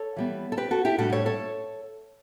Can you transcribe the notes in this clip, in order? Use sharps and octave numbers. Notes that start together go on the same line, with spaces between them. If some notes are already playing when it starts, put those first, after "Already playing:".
Already playing: A4 C#5
E3 G3 B3
A4
G4 B4
F#4 A4
E4 G4
A2 G3 D4 F#4 A4
A4 C#5
A4 C#5